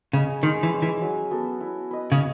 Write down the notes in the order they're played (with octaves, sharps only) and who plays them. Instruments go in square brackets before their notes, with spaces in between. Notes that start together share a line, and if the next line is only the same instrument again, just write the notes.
[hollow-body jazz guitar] C#3 [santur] G#4 D#5
[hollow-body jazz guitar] D#3 [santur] G#3
[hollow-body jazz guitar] E3
[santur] C#4 G#4
[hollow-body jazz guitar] E3
[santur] F#3
B3 F#4 A4
E4
B4 D#5
[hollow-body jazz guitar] C#3